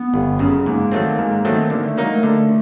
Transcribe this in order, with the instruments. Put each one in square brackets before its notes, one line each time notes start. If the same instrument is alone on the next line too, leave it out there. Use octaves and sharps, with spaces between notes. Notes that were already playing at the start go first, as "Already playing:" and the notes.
Already playing: [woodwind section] B3
[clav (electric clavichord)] G1
F#2 C#3
[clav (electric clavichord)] G#2 [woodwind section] A#3
[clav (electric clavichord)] D#3 F#3 A3 C4
G#2
D#3 F#3 A3 C4
[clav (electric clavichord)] D3 [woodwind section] A#3
[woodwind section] A3
[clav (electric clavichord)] F#3 A#3 D#4 [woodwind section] G#3
[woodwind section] A3
[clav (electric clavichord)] D3